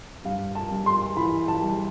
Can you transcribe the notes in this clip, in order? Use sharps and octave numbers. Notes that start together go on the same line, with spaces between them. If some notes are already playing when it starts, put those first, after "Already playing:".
G2 F5
A5
G2
C6
E3 B5
A5
G3